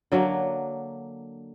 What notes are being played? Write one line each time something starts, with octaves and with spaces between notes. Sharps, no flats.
D3 F#3 A#3